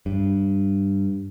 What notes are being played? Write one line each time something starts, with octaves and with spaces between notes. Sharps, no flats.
G2